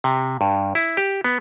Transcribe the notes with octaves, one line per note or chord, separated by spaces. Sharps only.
C3
G2
E4
G4
B3